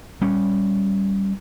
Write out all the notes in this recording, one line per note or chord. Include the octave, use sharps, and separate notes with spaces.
G3 C#4